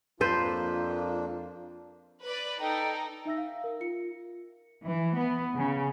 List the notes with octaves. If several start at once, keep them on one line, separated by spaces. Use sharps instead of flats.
F2 A#3 D4 F4 A4 B4 C5
B4 D5
D#4 A4 G5
D#4 E5 E6 A#6
F5
A#4
F4 C#7
E3
B3
C#3